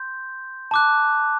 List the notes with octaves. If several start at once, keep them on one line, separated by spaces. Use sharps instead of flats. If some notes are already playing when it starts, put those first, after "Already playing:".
Already playing: C6 G6
A5 D6 F#6